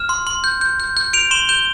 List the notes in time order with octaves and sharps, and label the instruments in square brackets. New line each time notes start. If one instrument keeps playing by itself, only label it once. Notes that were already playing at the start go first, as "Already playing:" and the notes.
Already playing: [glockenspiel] F6 E7
C6
C6
G6
G6
G6
G6
G6 D7 F7
C6 E7 G7
G6 E7 G7